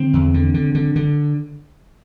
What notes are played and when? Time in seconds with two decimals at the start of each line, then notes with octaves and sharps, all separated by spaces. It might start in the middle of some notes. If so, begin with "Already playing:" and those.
Already playing: D3 C4
0.13 E2
0.34 D3
0.54 D3
0.75 D3
0.96 D3